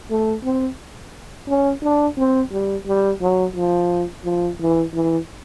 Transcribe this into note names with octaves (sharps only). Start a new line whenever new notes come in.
A3
C4
C#4
D4
C4
G3
G3
F#3
F3
F3
E3
E3